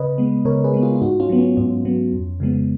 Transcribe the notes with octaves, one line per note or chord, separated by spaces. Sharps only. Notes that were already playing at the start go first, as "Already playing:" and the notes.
Already playing: C#3 B4 D#5
G#3 B3
C#3 A#4 C#5
G#4 B4
G#3 B3
F4 G#4
F4
G#2 D#4 F#4
C#4 F4
F#3 B3
C#4
G#2 C#4
F#3 B3
F2
C#3 F3 G#3 B3